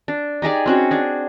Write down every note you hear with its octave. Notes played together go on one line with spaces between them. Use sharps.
D4
D#4 G4 G#4 D5
C4 C#4 F#4
D4 G#4